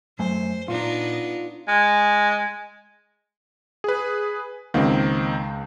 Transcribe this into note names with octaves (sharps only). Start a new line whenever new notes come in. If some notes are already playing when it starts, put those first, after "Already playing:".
F#2 F#3 A3 C5 G#5
A#2 B3 D4 D#4 F4
G#3
G#4 B4
C#2 D#3 A#3 C4